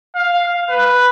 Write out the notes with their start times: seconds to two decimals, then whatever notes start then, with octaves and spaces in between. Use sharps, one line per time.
0.16 F5
0.70 B4